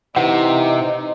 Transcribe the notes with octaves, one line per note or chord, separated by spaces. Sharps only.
C3 E3 D#4 F#5